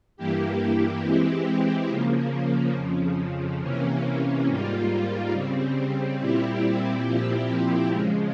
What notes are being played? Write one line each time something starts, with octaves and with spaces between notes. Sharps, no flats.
G2 E3 A#3 E4 G4
E3 G#3 C4 E4 G4
C#3 F3 A#3
F2 C#3 F3
C3 E3 A#3 C#4
G#2 G3 A#3 F4
C#3 G3 C4
A#2 G3 C4 E4 G4
A#2 F3 C4 E4 G4
C#3 F3 G#3